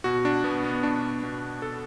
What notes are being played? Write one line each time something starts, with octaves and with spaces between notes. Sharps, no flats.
B2 F#4
D4
B2 B3
B3
B2 D4
B2
A4